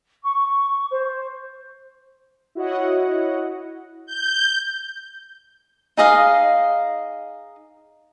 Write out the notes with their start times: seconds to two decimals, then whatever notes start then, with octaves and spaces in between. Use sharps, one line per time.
0.23 C#6
0.90 C5
2.55 E4 F#4 C#5 D#5 F#5
4.06 G6
5.97 D#4 G#4 D#5 F5